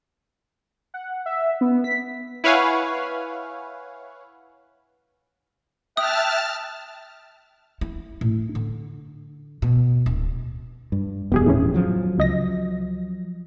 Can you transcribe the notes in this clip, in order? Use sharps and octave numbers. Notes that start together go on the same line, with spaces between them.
F#5
E5
B3
B6
E4 B4 C#5 F5 F#5 G#5
E5 G5 A5 D#6 F6 F#6
E4
A2
D3
B2
D1
G2
D#1 F2 B3 G4 G#4
A2 E3 C#4
F3 F#3
C#2 D#5 A#6